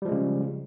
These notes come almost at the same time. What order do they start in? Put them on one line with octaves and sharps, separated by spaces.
G3 F3 G#3 C#3